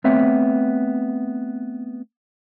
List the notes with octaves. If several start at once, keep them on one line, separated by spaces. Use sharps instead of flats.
A3 B3 C4 C#5 E5